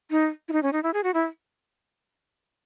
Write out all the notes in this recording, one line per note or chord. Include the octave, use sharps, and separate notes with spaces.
D#4
E4
D#4
C#4
D#4
E4
G#4
F#4
E4